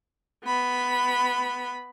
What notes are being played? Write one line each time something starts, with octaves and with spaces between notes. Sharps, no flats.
B3 B5